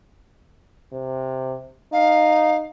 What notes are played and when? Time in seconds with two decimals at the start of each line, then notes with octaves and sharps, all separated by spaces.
0.92 C3
1.93 D#4 F5